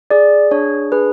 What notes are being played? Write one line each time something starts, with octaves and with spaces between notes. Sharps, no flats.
G#4 D5
D4 C#5
G#4 B4